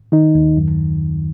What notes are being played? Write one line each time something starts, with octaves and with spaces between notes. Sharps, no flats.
D#3 D#4
D#2
F#2